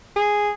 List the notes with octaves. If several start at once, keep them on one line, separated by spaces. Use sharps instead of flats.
G#4